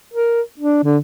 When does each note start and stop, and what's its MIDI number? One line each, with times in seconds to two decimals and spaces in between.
0.14 0.41 70
0.59 0.83 62
0.83 0.98 50